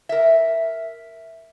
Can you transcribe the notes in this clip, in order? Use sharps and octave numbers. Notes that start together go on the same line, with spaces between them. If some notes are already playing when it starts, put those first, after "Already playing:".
A#4 E5